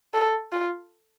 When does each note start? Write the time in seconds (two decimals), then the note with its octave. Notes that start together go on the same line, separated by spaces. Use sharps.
0.14 A4
0.52 F4